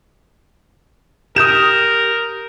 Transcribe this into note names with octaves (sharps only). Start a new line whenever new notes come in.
G4 A#4 D#6 G6 E7